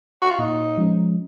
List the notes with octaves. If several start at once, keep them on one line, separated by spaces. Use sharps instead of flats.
F#4
F4
A#2 D#4
F3 G#3 C#4